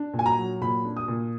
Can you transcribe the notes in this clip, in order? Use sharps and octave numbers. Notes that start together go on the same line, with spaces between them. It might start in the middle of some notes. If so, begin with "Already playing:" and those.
Already playing: D4
A#2
G#5
A#5
F#3
A#2 B5
D4
D#6
A#2